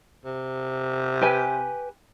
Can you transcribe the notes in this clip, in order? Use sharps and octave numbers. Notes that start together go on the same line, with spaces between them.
C3
G4 B4 G#5